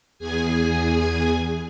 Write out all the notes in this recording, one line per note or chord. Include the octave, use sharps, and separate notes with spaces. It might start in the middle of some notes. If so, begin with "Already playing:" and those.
E2 G#4 G#5